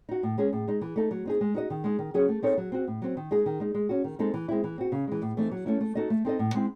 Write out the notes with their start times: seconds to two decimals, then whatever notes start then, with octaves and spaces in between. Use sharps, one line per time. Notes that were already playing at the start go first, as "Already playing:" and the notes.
0.09 D#4 F#4
0.23 A2
0.38 G#3 C#4 G#4
0.53 A2
0.68 G#3 D#4
0.81 E3
0.96 A3 D#4 A4
1.11 F#3
1.25 C4 D#4 G#4
1.41 G#3
1.54 D#4 F#4 C5 D#5
1.70 D#3
1.84 G#3 D#4
1.99 D#3
2.14 F#3 C#4 G#4 C#5
2.28 A3
2.42 C4 D#4 A4 C#5
2.58 F#3
2.72 C4 F#4
2.87 A2
3.02 F#3 C4
3.17 D#3
3.31 G#3 D#4 G#4
3.46 D#3
3.60 G#3 D#4
3.75 G#3
3.89 C#4 F#4
4.04 D#3
4.19 G#3 C4 D#4 A4
4.34 E3
4.48 G#3 C4 E4
4.64 E3
4.78 C4 F#4
4.92 C#3
5.07 E3 G#3
5.22 A2
5.37 E3 A3 C4 D#4
5.52 F#3
5.66 A3 C#4 E4
5.81 A3
5.95 D#4 F#4 A4 D#5
6.10 A3
6.25 C4 D#4 A4 D#5
6.39 A2
6.54 G#3 C4 E4